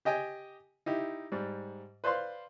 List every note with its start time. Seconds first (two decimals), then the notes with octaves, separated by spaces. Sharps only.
0.05 G4 D#5 G5 G#5
0.86 D#4 E4 G4
1.32 G#2 G3
2.04 B4 C5 D5 F5 C6